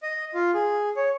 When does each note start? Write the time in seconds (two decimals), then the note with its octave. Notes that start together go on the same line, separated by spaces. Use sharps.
0.03 D#5
0.34 F4
0.54 G#4
0.96 C#5